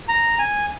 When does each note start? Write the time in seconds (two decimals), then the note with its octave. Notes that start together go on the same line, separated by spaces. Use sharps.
0.08 A#5
0.39 G#5